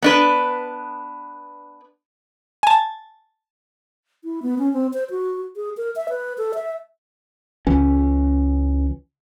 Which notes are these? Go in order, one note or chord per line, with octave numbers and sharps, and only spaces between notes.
B3 D4 B4
G#5 A5
E4
B3
C#4
C4
C5
F#4
G#4
A#4
E5
B4
A4
E5
C#2 E3 C#4